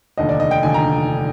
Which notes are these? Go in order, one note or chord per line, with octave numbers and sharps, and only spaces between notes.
F1 D#2 D3 D#5
D5
D#5
G5
F1 D#2 D3 G#5
A#5